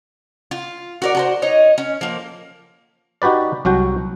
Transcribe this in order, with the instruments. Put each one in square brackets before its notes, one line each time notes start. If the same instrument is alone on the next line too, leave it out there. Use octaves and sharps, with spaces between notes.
[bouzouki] F4
F#4 A#4 D5
F#4 A4 C5
D#4 C#5 D#5
C#4
F3 A#3
[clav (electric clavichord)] D#4 F#4 G4 B4 D5
C2 F#3 F#4 G5